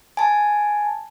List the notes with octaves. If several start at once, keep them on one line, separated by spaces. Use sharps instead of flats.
G#5 A5